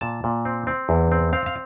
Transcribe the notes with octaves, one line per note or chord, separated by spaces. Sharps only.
A#2 A5
A#2
C4
C4
E2
C4
C4 F5
F5